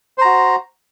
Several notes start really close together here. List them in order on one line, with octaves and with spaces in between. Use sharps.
C5 A#5 F#4